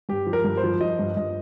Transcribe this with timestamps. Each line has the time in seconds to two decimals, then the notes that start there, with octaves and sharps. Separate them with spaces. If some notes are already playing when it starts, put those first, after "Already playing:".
0.09 G2 G4
0.27 F3
0.33 A#4
0.44 G2
0.57 C5
0.64 F3
0.81 F3 D#5
0.99 G2
1.17 G2 D#5